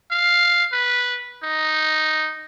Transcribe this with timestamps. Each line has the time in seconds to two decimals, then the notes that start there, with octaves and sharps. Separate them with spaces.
0.11 F5
0.73 B4
1.44 D#4